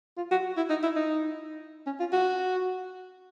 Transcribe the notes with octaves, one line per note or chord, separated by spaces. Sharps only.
F4
F#4
E4
D#4
E4
D#4
C#4
F4
F#4